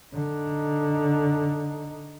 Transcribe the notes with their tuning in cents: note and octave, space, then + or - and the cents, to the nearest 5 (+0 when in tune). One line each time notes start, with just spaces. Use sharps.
D3 +0 D#4 +0